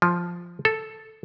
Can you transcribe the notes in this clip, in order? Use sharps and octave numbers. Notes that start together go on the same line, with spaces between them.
F3
A4